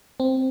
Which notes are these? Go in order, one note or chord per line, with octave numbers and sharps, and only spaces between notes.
C4